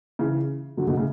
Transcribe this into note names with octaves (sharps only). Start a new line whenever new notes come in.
C#3 E3
D3 F#3
B2 D3
A2 C#3